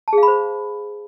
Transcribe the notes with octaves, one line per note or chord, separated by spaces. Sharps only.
A5
G#4
F5
B5
C5